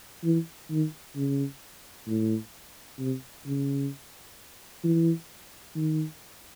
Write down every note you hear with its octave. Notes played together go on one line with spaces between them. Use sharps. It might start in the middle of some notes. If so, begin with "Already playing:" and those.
E3
D#3
C#3
A2
C3
C#3
E3
D#3